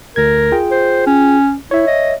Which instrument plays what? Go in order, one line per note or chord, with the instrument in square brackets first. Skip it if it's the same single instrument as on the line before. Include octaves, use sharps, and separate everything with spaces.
[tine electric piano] D2 G#6 [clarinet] A#4
[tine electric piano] F4 G#4 G5
[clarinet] C5
C#4
[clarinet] E4 [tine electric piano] C#5 E5
[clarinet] D#5